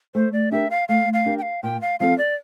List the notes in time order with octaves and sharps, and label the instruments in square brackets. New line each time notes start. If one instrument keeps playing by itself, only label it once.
[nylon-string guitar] A3 [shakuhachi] C5
[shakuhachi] D5
[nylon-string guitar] D4 G4 A#4 [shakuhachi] E5
[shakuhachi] F5
[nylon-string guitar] A3 [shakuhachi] F5
[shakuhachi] F5
[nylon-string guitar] D4 G4 A#4
[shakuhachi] G5
F5
[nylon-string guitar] A#2 [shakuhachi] G5
[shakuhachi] F5
[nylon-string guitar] F3 C4 F4 A4 [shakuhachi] F5
[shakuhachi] D5